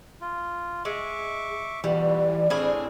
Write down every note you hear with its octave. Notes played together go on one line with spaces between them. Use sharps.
F4
G#3 E5 C#6 D6
F2 B2 E3 G3 D5
F2 A2
A2 C4 D4 E4 G#4 F6